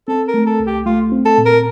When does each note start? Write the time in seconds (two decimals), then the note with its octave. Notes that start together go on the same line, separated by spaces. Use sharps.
0.08 C4 A4
0.28 A#4
0.34 A3
0.46 A4
0.60 C2
0.67 G4
0.86 A3 F4
1.12 C4
1.25 A4
1.38 A#2
1.45 A#4